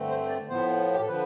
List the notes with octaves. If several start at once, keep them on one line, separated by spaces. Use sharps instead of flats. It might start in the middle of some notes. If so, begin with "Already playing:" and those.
Already playing: G2 D3 A3 C4
C5
D5
A2 F3 B3 C5
G4
A4
D3 F3 B4